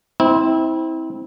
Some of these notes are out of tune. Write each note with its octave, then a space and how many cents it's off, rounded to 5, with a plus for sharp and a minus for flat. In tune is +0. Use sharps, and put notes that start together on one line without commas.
C4 +0 E4 -30